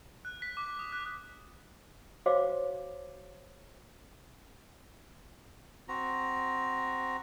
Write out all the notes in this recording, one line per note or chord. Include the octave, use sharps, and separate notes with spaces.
F#6
B6
D6
D#6
F#6
F#4 C5 C#5 D#5 F5 D6
C4 F#4 A#5